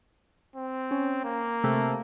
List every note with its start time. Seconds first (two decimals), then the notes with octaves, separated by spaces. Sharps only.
0.56 C4
0.91 C#4
1.25 A#3
1.64 C3 A3